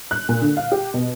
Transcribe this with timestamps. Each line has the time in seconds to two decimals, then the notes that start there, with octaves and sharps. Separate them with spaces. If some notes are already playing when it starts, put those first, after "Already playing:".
0.11 F#6
0.29 A#2
0.42 D3
0.57 F5
0.72 G4
0.94 B2